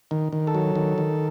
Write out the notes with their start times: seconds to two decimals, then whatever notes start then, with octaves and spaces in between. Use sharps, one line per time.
0.11 D#3
0.33 D#3
0.47 A4
0.55 F#3
0.75 D#3
0.98 D#3